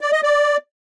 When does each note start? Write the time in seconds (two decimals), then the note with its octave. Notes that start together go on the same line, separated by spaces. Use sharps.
0.01 D5
0.12 D#5
0.23 D5